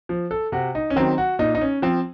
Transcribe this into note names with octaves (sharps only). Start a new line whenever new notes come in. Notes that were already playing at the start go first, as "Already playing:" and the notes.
F3
A4
C3 F#4
D#4
C#4
D#3 F#3 C4
F#4
A#2 D#4
D#4
C#4
F3 C4